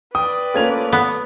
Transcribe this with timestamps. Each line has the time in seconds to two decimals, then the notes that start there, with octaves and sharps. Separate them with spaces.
0.15 B4 D5 G5 D#6
0.54 A3 A#3 C#4 F4 G#6 F7
0.93 B3